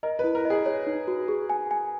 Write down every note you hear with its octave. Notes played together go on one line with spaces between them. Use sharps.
A#4 D#5
B4
E4
A#4
D#5
G#4
C#5
D#4
F#4
G#4
G#5
G#5